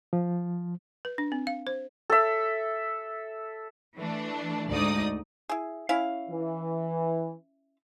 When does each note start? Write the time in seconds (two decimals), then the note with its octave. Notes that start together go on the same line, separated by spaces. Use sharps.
0.13 F3
1.05 B4
1.18 D4
1.32 C4
1.47 F5
1.67 C5
2.10 A4 E5
3.98 E3 A3 D4
4.69 D2 G#2 D#4 D5 D#6
5.49 E4 G#4
5.89 C#4 E4 F5
6.30 E3